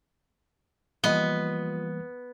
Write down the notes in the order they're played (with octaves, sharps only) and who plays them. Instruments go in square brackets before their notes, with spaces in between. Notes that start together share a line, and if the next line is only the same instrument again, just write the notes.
[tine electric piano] E3 G3 A#3 [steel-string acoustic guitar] F3 D#5 [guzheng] B3